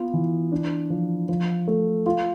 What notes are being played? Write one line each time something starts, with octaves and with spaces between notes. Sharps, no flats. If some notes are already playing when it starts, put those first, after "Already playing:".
Already playing: B3 F4
E3
D4
F3
F3
A3
F4